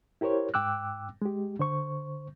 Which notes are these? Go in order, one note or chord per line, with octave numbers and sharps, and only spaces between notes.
E4 G4 A#4 C5 C#5
G#2 G5 D6 E6 F#6
G#3 G4
D3 C5 C#6